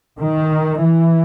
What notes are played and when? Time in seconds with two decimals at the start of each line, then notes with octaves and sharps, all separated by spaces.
0.18 D#3
0.83 E3